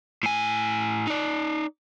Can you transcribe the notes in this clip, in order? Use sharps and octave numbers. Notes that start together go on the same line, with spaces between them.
A2 G#5
D#4 D5